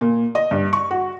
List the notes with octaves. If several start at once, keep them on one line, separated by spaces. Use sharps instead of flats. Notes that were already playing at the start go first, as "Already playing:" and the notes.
A#2
D#5
G2
C#6
F#4